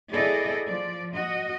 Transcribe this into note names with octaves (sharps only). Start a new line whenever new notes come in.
B3 E4 G#4 A4 D5 D#5
F3 D5
F#4 D#5